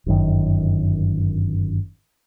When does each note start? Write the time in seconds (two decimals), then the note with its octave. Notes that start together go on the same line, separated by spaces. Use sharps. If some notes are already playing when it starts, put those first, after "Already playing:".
0.06 G1 F#2 D#3